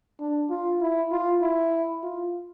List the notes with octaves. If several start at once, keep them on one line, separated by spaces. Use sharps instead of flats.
D4
F4
E4
F4
E4
F4